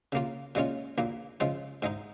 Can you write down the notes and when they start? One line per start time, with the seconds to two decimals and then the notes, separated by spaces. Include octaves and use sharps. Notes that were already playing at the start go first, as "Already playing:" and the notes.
0.12 C#3 A#3 F4
0.55 A#2 G#3 C#4 F4
0.98 A#1 A#2 A#3
1.40 C#3 F3 G#3 F4
1.82 G#2 G#3 D#4